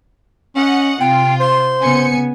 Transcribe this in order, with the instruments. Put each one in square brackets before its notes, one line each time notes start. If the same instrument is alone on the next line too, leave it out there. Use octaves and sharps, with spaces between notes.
[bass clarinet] C#4 [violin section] D#5 F#5
[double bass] C3 [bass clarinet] C4 [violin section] F4 [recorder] G5
[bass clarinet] C5 [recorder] C6
[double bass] C#3 B3 [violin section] G#5 C#7